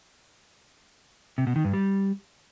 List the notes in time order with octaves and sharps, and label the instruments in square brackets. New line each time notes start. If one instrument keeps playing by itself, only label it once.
[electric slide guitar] C3
B2
D#3
G2
G3